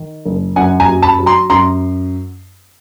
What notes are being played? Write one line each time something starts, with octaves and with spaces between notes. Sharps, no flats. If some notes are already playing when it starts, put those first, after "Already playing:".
Already playing: D#3
F#1
F#2 F#5 G#5
G#5 A#5
F#3
A5 B5
F#3
A#5 C6
F#2 A#5 C6